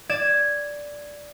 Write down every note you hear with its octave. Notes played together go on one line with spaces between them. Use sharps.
D5 G#6 E7